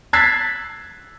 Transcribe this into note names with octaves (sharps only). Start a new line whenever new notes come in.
E6 F#6 G#6 A6 B6 C7